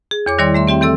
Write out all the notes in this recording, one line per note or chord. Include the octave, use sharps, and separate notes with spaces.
G#4
E2 C#5 D6
D#3 G3 E4 C#5 D5 C6
A3 E5 C6
C4 G4 E5 G5
E3 C4 A4 E6